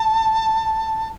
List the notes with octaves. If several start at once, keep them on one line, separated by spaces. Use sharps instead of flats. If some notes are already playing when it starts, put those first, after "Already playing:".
Already playing: A5